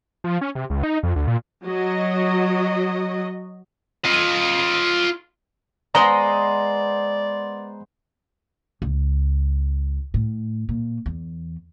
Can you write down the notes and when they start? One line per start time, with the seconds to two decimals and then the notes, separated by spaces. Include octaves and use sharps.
0.24 F3
0.41 C#4
0.55 C3
0.70 C#2
0.83 D#4
1.03 F2
1.16 D2
1.27 A#2
1.66 F#3 F#4 D#5
4.04 F4 D#5
5.95 G#3 B3 C5 D5 D#5 A#5 C6
8.82 C#2
10.14 A2
10.69 A#2
11.06 E2